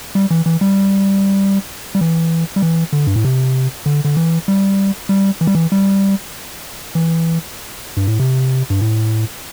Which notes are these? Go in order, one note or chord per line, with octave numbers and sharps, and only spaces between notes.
G3
E3
E3
G3
G3
E3
G3
E3
D3
G2
A2
C3
D3
D3
E3
G3
G3
E3
G3
E3
G3
E3
G2
A2
C3
G2
A2